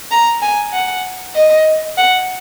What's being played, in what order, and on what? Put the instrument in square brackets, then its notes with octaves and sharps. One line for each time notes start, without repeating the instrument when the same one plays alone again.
[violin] A#5
G#5
F#5
D#5
F#5